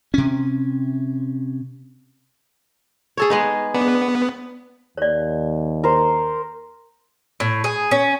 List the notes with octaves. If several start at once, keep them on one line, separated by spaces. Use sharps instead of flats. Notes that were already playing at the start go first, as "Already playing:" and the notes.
C3 C#4
G#4 A4 C#5
G#3 B3 D#4
B3 D4
D#2 C#5 D5
A#4 C5
A2
G#4
C#4